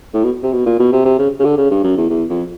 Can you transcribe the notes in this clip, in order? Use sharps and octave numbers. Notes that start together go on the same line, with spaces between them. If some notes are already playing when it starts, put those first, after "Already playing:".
A2
B2
C3
B2
A#2
B2
C3
C3
C#3
C#3
D3
C#3
G2
F#2
E2
E2
F2